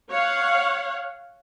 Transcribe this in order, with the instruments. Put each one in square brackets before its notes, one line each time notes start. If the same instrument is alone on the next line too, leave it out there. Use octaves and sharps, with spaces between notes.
[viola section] C#5 F5 F#5